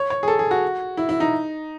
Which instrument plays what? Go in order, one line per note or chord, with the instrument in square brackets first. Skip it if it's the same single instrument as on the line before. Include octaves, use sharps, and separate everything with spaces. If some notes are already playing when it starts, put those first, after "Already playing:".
Already playing: [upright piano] C#5
C#5
G#4
A4
G#4
F#4
E4
E4
D#4